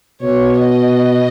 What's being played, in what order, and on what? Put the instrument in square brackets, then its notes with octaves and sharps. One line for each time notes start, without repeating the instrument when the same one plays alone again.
[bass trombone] B2 [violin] C#5
[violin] D#5